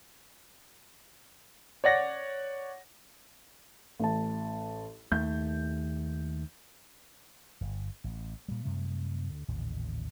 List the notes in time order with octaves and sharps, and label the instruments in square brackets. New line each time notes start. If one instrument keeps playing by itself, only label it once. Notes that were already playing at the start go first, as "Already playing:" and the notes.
[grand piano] C#5 D5 F#5 A#6
[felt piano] A1 A5
[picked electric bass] D#2 A3 [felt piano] G6
[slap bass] D1 G1
A1
A#2 G3
F#2 C3 G3 A3
D2 D3
A1 D#2 A#2 C#3